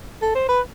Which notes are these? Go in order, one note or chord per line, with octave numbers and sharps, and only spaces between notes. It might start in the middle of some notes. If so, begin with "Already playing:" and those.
A4
C5
B4